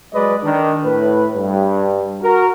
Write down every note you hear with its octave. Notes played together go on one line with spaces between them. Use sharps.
F#3 G#3 B4 D5 D#5
D#3 D4
A2 B4
G2
F#4 A#4